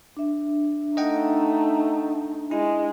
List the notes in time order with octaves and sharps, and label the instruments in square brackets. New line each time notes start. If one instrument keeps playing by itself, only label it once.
[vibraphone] D4 E5
[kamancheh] A3 D#4 [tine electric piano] D#5 F#5 G5
[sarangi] G#3 [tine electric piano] E4